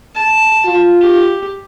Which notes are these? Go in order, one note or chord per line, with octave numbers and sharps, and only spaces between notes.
A5
F4
G4